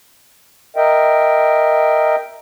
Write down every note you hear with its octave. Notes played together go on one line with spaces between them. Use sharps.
A#4 D#5 E5 G5